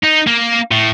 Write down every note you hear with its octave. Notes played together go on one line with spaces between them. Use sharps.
D#4
A#3
A2